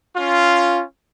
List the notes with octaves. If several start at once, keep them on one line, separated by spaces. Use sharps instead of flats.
C#4 F4